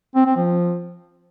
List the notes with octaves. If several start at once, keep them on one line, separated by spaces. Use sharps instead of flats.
C4
C4
F3